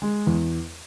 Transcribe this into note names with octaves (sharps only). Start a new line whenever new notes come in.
G#3
E2